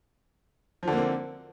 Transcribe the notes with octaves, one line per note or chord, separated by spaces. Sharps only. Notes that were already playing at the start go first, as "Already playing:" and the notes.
D3 F3 A#3 C4